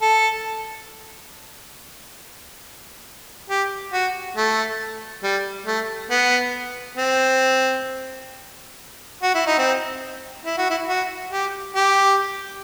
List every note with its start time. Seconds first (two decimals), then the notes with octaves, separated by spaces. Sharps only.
0.02 A4
3.49 G4
3.93 F#4
4.36 A3
5.23 G3
5.67 A3
6.11 B3
6.97 C4
9.22 F#4
9.35 E4
9.46 D#4
9.59 C4
10.45 E4
10.58 F#4
10.70 E4
10.89 F#4
11.32 G4
11.76 G4